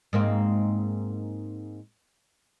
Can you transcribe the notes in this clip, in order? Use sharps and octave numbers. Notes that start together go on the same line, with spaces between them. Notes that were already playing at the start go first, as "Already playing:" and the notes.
G#2 A#3 C4